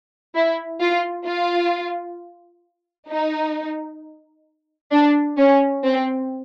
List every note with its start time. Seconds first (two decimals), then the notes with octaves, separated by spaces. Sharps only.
0.35 E4
0.80 F4
1.26 F4
3.09 D#4
4.92 D4
5.38 C#4
5.84 C4